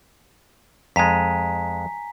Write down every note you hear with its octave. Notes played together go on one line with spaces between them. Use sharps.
F2 G#3 G#5 A#5 B6